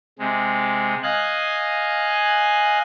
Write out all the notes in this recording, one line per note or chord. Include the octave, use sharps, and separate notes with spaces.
C3 G#3
D#5 F5 G#5 F#6